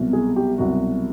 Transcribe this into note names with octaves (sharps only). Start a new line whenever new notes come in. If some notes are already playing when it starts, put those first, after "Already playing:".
Already playing: C2 B2 F#3
G#4
G4
C2 B2 F#3 F#4